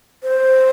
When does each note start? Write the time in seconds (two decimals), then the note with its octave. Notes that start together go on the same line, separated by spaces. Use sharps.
0.23 C5